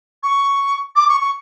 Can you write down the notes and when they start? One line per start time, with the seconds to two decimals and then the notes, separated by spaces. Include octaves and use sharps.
0.23 C#6
0.96 D6
1.09 C#6
1.21 C#6